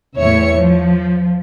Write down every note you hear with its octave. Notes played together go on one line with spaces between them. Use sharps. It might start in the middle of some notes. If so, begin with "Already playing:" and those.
E2 A2 C#5 E5 C#7
F3